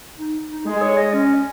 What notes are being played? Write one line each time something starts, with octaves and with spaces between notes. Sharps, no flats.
D#4
D#4
G#3 G#4
C#5
D#5
C#4